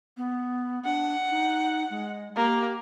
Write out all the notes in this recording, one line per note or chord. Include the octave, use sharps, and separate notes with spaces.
B3
D4 F#5
D#4
G#3
A#3 G4